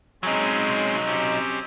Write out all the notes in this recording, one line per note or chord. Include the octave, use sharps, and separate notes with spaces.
F#3 G#3 C4 C#4 D#4
C4 C#4 G4